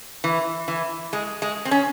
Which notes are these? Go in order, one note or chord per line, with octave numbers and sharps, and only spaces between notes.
E3
E3
G#3
G#3
C4
C#4